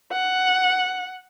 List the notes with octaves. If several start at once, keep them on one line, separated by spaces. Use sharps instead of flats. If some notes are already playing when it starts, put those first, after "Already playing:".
F#5